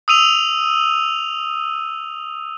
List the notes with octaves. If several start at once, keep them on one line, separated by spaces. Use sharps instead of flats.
D#6 E6 D#7 F7